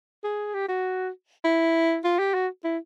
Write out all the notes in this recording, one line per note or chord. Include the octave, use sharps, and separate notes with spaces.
G#4
G4
F#4
E4
F4
G4
F#4
E4